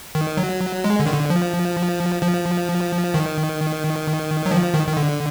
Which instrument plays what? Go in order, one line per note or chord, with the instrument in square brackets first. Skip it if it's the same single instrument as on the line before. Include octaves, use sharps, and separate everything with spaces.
[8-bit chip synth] D#3
F#3
G#3
D3
D#3
D3
F3
F3
D#3
F#3
F3
D#3
D#3
D3